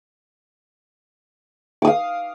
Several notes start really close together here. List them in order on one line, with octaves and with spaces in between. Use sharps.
D6 D#6 F5